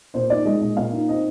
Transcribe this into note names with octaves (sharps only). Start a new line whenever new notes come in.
A#2 C5
D#4 D5
G#3 D#5
A#2 D#5
A#2 F5
D#4
C4 D#5